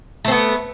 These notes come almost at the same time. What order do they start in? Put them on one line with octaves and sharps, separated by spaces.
A3 C4 B3